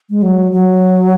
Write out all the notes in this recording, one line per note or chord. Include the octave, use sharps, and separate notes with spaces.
G#3
F#3
F#3